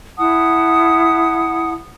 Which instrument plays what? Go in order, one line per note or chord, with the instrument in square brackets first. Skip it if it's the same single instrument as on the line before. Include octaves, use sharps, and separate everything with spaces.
[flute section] E4 F#5 A5 D#6